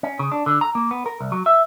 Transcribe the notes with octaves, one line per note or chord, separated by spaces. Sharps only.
C#4
C#3
D4
D3
A#5
A#3
B3
A#4
C2
F#3
E5